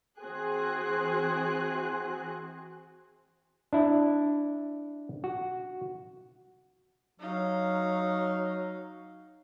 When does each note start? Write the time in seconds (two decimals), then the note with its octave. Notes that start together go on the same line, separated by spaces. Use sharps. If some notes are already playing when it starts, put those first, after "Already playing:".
0.20 E3 C4 F#4 G#4 F#6
3.73 D4 E4
5.24 F#4
7.20 F#3 D#4 F5